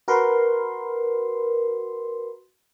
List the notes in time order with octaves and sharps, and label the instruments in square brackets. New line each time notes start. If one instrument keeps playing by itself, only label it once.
[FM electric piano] F#4 A#4 B4 C6